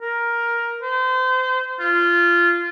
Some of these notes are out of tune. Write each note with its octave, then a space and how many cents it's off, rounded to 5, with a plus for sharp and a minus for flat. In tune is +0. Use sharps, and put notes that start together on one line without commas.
A#4 +10
C5 -30
F4 -15